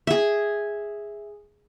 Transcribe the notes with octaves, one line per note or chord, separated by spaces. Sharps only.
G#4 E5